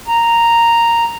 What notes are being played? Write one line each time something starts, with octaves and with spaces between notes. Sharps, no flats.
A#5